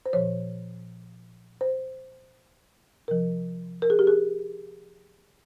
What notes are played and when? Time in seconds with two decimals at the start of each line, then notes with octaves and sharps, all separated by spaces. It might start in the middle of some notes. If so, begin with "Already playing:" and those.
0.06 C5
0.13 A#2 F3 C#5
1.61 C5
3.08 C3 F3 A#4
3.82 A#4
3.90 G#4
3.99 G4
4.07 G#4